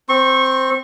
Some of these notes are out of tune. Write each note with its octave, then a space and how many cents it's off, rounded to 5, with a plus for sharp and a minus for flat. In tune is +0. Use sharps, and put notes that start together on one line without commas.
C4 +0 C#6 -25